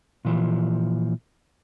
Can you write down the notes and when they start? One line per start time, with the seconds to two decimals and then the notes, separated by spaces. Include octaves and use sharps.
0.25 A#2 E3 F3